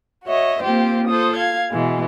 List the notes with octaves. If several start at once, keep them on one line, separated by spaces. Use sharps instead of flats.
F#4 C#5 D#5 E5
A#3 C4 F4 G4 C5
F4 A4 C5 D#6
F5 G#6
B2 E3 G#3